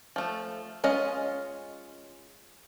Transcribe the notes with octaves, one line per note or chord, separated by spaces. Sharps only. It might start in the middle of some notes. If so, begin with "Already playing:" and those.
F3 A3
G#3 C#4 F4 D#5